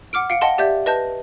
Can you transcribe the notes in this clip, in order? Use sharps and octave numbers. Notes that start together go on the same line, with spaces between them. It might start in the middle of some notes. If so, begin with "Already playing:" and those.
F#5 D6 F6 D7
F5 C#7 D7
D#5 F#5 G5 A5 C6
G4 D5 E5 G6
B4 D#5 A5 G6